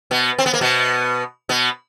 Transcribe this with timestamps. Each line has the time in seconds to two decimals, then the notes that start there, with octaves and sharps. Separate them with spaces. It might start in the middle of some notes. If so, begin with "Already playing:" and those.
0.11 B2 B3
0.39 C4
0.46 B3
0.54 A#3
0.61 B2 B3
1.49 B2 B3